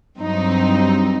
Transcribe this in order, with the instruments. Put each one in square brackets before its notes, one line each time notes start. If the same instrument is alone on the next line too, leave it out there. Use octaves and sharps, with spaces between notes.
[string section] G2 F#3 C4 D#4